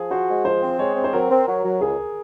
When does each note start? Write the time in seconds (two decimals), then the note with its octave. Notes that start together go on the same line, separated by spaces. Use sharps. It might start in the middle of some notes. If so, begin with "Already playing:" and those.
Already playing: F3 G#4
0.11 F#4 C5
0.28 G#3
0.45 F3 C5
0.62 C4
0.79 G#3 C#5
0.96 C4
1.04 C5
1.13 F#3 A#4
1.30 C4
1.48 F#3
1.64 F#3
1.81 C#2 G#4